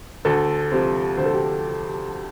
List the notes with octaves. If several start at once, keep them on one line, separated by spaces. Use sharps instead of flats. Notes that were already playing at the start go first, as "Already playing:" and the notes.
D2 A4
C3 F3 C5
D2 C5
A4
G4